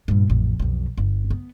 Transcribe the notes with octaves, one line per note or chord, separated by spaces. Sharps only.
G2 A#2
A1 F2
B1 F2
G1
B3